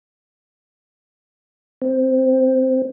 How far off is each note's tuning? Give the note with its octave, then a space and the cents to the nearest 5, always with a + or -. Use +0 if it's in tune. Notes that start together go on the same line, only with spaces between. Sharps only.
C4 -5